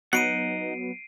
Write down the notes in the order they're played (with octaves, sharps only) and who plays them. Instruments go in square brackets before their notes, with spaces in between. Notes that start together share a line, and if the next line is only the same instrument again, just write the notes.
[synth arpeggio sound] F#3 B3 [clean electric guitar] D#4 F#5 [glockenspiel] C7 D7 D#7